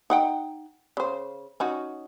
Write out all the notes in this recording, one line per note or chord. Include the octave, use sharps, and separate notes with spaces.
D#4 F#5 G5
C#3 C5
C#4 D#4 F#4